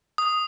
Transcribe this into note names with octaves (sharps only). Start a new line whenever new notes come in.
D#6